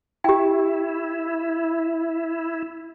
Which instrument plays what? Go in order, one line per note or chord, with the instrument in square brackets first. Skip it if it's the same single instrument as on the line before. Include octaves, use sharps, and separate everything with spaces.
[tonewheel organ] E4 [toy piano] G4 G5